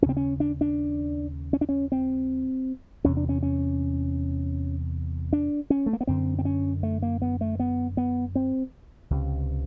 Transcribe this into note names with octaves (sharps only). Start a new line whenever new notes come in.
D#2 C#3 C4 C#4
C#4
D4
D4
C#4
D4
C#4
C4
E2 C3 C#4
D4
C#4
C#4
D4
C#4
A3
A#3
B3
F#2 D3 C4
C4
C#4
A3
A#3
B3
A3
B3
B3
C4
C#2 C3